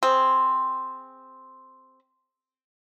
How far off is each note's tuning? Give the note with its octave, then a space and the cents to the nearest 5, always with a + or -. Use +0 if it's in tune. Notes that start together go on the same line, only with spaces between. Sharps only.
C4 +0 G#4 +0